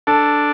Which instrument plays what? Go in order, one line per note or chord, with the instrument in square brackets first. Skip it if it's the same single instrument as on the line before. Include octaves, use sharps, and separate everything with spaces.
[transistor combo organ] D4 [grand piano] A4